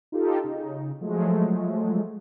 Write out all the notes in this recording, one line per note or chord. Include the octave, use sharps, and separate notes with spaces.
D#4 F4 G4 A4
C#3 D#4
F3 F#3 G#3 A3